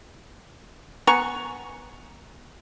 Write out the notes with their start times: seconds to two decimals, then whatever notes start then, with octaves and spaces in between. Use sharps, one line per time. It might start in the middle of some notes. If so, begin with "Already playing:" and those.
1.07 B3 G#5 A#5 C#6